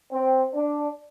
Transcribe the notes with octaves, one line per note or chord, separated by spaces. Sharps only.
C4
D4